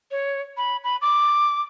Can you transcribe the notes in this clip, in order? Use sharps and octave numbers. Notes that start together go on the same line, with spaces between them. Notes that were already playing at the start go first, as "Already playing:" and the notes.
C#5
B5
B5
D6